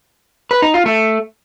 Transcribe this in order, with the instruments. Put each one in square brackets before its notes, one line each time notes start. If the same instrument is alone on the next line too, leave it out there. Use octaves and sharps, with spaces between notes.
[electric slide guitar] B4
D#4
F4
A3